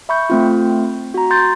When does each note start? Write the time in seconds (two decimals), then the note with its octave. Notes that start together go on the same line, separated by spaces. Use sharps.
0.09 E5 B5 C#6 G6
0.30 A3 C4 F4
1.14 F#4 A#5
1.30 A#5 C6 G6 A6